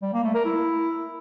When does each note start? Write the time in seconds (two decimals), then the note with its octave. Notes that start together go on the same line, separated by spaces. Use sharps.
0.03 G3
0.13 A#3
0.24 A3
0.35 A#4
0.45 E4